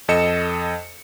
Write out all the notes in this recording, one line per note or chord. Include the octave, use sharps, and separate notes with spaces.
F2 A4 D#5 C#7 E7